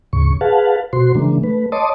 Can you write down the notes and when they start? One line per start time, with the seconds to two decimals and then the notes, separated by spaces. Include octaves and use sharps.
0.13 D2 G#2 C#3 C#6
0.41 G#4 B4 F5 F#5 A5
0.93 B2 F#4 C5 C6
1.15 C#3 E3 G#3 A#3 D4
1.43 A3 B4
1.72 C#5 D#5 A5 C6 D6 D#6